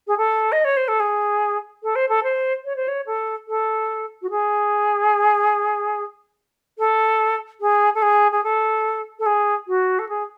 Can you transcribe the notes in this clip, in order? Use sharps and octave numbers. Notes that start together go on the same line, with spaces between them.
G#4
A4
D#5
C#5
C5
A4
G#4
A4
C5
A4
C5
C#5
C5
C#5
A4
A4
F#4
G#4
A4
G#4
A4
G#4
G#4
A4
A4
G#4
F#4
A4
G#4